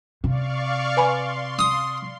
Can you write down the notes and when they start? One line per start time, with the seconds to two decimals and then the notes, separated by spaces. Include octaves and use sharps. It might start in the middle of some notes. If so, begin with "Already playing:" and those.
0.24 C3 D5 F5 C#6
0.97 B4 G#5 B5 C6
1.59 D#6